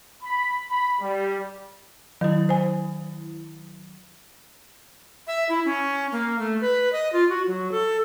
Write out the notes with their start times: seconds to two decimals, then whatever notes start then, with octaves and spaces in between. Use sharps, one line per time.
0.23 B5
0.70 B5
1.01 G3
2.21 D#3 F#3 E4
2.49 C5 G#5
5.27 E5
5.49 E4
5.65 C#4
6.12 A#3
6.39 A3
6.61 B4
6.93 D#5
7.13 F4
7.29 F#4
7.47 F#3
7.72 A4